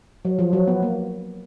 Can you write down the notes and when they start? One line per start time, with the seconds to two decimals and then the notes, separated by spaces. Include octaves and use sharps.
0.25 F#3
0.39 F3
0.53 F#3
0.68 B3
0.82 A#3